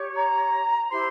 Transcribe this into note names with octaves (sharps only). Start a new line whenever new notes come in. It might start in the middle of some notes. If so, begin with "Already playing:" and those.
Already playing: G4 C#5
A#5
E4 G4 C5 C6